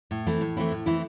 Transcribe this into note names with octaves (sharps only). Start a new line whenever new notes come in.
A2
E3 A3 C4 E4
A2
E3 A3 C4 E4
A2
E3 A3 C4 E4